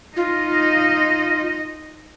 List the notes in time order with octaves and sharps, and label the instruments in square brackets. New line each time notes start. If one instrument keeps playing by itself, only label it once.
[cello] D#4 D#5 [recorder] F4